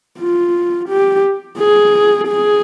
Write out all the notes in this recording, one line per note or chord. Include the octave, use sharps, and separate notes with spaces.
F4
G4
G#4
G#4